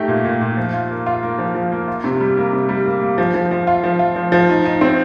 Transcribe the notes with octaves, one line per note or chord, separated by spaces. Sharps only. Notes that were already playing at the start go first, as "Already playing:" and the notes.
Already playing: A3 D#4 G4
A#2
A#2
A#2
F3
F4
A#3
F4
A#3
F3
F3
A#3
F4
C3
G3
A#3
C3
G3
A#3
A#3
F3
F3
F3
F4
F3
F4
F3
F3
D#4
D#4
C4